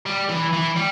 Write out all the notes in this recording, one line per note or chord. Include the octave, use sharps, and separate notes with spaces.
G3
E3
E3
G3